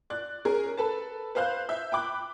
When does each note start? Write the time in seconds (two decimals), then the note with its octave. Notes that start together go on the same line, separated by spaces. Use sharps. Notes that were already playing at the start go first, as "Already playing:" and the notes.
0.10 D5 F#6
0.45 C#4 G#4 A#4
0.78 A4 B4 A5
1.35 B4 C5 F5 F#6 G6
1.69 E5 G6
1.92 G5 B5 D6 F#6